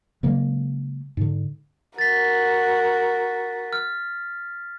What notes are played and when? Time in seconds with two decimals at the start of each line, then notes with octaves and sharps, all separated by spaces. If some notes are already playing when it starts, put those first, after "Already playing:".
0.23 C#3 F#3 G#3 A#3
1.17 G#2 D3
1.98 F#4 A#4 A6 B6
3.73 F6